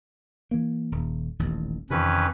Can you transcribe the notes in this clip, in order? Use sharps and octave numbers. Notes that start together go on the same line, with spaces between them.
E3 A#3
D#1
D#1 A1 D#2
F2 C3 D#3 E3 C#4 B4